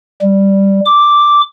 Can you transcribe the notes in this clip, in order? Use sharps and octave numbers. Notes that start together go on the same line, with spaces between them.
G3
D6